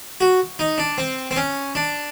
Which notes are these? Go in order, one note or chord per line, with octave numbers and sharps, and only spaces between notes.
F#4
D#4
D4
C4
C4
C#4
D4